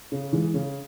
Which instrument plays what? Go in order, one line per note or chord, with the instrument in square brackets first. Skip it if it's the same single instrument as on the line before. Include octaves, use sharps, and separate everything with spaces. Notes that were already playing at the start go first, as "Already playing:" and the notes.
[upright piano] C#3
E3 G#3
C#3